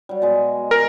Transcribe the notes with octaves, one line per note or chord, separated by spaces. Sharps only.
F#3 G3
B2 G#3
A#4